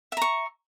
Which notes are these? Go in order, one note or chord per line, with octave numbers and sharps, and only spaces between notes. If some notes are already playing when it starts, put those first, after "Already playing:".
E5 A#5 C#6